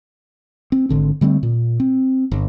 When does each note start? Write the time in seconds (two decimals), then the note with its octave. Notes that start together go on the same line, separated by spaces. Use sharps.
0.72 C4
0.89 G#1 D3 C4
1.21 D3 G3 A3 C4
1.43 A#2
1.80 C4
2.32 G1